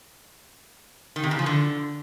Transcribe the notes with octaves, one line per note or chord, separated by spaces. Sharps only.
D#3
C3
C#3
F3
D3